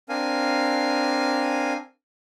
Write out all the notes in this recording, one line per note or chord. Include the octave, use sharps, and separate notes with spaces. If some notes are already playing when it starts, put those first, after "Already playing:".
C4 D4 A#4 F5 G#5